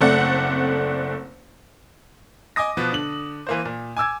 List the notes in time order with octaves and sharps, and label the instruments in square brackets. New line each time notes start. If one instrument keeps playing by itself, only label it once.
[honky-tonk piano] F#1 A3 C4 D5 F#5
[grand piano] D#5 G#5 D6 D#6 A#6
B2 F3 B3
D3 F#7
E3 A#3 C5
A#2
G#5 D6 E6 G#6